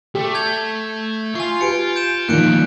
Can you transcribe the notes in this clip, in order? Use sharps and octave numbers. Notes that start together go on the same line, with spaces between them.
A3 G4
G6 G#6 F7
F4 G#5 C#6
G4 B4 G#5 C#7 D7
G6 D7 E7
G2 A#2 D#3 F3 A#3 F#6 C#7 D7